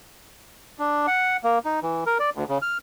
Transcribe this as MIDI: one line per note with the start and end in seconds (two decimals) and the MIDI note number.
0.79 1.06 62
1.07 1.37 78
1.44 1.59 58
1.65 1.80 63
1.83 2.04 52
2.06 2.18 70
2.19 2.30 74
2.35 2.44 38
2.49 2.58 49
2.62 2.78 89